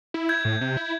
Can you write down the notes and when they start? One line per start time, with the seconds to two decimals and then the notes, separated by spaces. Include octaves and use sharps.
0.14 E4
0.29 G6 G#6
0.45 A2
0.61 C3
0.77 E4